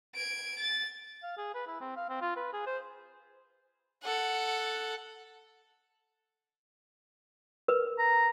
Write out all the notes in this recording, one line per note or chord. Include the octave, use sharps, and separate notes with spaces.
G#6 D7
A6
F5
G#4
B4
E4
C4
F5
C4
F4
B4
G#4
C5
A4 F#5
A#4 B4
A#5